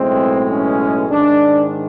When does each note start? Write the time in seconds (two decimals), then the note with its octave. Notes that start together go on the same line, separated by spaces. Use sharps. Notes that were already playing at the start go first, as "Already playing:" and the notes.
Already playing: B1 A2 E3 G#3 C4
0.50 C#4
1.09 G#2 D#3 G#3 D4